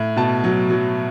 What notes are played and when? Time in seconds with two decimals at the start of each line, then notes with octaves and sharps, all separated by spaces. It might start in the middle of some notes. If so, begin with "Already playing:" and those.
Already playing: A2
0.17 B2 A5
0.44 F#3
0.70 F#3